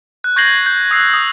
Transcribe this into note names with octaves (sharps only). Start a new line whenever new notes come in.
F#6
C#6 G6 G#6 A#6 C7 F#7
G6
D#6 E6 F#6 C7
D#6